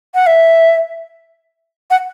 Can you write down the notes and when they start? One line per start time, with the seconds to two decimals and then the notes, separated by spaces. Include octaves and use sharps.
0.14 F#5
0.26 E5
1.90 F#5